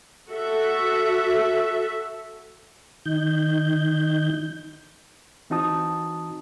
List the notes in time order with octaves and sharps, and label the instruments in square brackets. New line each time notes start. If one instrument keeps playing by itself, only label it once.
[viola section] F#4 A4 E5
[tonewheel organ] D#3 D#4 G6
[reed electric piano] E3 C4 D#4 F#4 A5 D#6